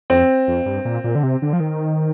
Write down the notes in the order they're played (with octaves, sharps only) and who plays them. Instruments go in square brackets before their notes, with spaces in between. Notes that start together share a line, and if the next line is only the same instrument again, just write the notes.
[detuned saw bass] F2 [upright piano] C4
[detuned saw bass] F2
G2
A#2
A#2
D3
C3
D3
F3
D#3